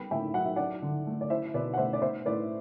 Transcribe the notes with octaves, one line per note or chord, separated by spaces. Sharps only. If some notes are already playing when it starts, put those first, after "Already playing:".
Already playing: G3 B3 G5 B5
A2 E5 G5
F#3 F#5
E5
D4 D5 F#5
D3
A3
D5
E4 C5 E5
B2 B4 D5
F#5
A3 C5 E5
D5
B3 C5 E5
A2 B4 D5